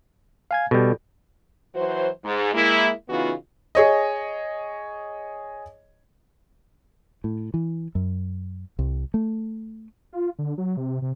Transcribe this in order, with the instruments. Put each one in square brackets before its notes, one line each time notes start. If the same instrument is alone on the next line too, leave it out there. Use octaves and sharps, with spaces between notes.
[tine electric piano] F5 G#5 G#6
[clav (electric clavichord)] B2 G3 [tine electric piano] A4
[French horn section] E3 F#3 F#4 C5
G#2
G#3 A#3 E4
C#3 E3 B3 D#4 F4 F#4
[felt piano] G#4 C#5 D#5
[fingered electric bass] A2
E3
F#2
C2
A3
[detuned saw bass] F4
D3
F#3
C3
C3